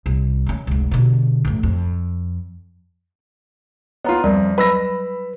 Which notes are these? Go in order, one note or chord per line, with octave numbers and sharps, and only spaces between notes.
C2
D#3 C#4
F1 C#2
B2 D3
A1 F#2
F2
B3 F4 C#5 A#5
F2 G3 A#4 D5
F#3 B4 B5 E6 A#6